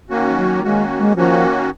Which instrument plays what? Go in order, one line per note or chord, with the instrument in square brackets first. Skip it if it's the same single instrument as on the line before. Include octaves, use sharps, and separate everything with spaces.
[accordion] D#3 A#3 C#4 F#4
[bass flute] F3
F#3
[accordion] D#3 A#3 C#4 F#4 [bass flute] G#3
[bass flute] G#3
[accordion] D#3 A#3 C#4 F#4 [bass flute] F3